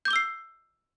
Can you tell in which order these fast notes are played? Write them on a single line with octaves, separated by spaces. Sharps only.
G6 D6 G7 E6 C7